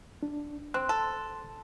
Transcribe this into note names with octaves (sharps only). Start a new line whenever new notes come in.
D4
C4 C6 F#6
A4